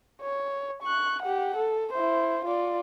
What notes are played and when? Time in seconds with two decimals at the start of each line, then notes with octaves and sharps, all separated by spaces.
0.21 C#5
0.82 C#6 F#6
1.22 G4 F#5
1.57 A4
1.93 E4 C5
2.44 F4 D5